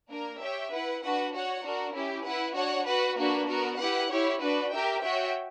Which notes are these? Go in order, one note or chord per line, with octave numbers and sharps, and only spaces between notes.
A#3 D4 A#4
G4 C#5 E5 G5
E4 B4 F#5
D4 F#4 B4 F#5
F#4 C#5 F#5
D4 F#4 A#4
C#4 E4 G4
E4 B4 F#5
D4 F#4 C#5 F#5
F#4 B4 F#5
A#3 D4 F#4 B4
B3 F#4 A#4
E4 G4 B4 F#5
E4 G4 C#5
D4 F#4 B4 D5
G4 A#4 E5 G5
F#4 C#5 E5 G5